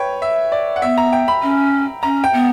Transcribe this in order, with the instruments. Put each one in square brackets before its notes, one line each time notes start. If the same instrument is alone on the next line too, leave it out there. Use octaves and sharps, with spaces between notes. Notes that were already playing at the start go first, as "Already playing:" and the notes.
Already playing: [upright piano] B4 C#5 G5
E5
D5
F#5
[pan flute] B3 [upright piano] E5
[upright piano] A#5
G5
B5
[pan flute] C#4
[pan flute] C#4 [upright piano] A#5
[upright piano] G5
[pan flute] B3